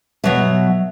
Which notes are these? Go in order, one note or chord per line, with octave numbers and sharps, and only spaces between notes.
B2 F#3 B3 E5